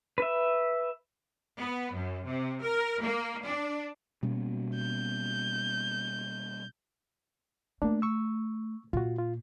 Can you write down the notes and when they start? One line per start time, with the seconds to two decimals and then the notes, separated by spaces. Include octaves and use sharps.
0.18 B4 E5
1.59 B3
1.94 F#2
2.25 C3
2.61 A#4
3.02 A#3
3.44 D4
4.23 B2 G3 A#3 C#4
4.75 G6
7.82 A3 A#3 D4
8.02 C#6 E6
8.93 A#2 F4 F#4
9.18 F4